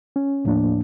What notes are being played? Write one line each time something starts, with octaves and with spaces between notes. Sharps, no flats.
C#4
D#2 A2 F3 A#3 D4